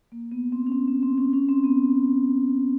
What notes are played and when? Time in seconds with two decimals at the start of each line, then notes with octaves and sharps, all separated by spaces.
0.12 A#3
0.32 B3
0.52 C4
0.67 C#4
0.72 C4
0.88 C4
1.03 C4
1.18 C#4
1.33 C#4
1.49 C4
1.64 B3